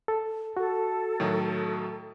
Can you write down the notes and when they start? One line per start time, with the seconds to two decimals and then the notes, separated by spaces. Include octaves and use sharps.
0.08 A4
0.57 F#4 A4
1.20 A2 D#3 F#3